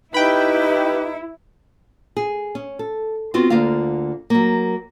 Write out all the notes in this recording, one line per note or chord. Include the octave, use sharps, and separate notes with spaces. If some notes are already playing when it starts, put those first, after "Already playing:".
D#4 E4 G4 B4 G5 B5
G#4
C#4
A4
B3 C4 F4 F#4
D2 D3 A#3 F4 F5
F#3 A#3